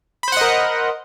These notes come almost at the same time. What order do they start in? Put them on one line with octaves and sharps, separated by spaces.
B5 C5 F#5 D#5 A#4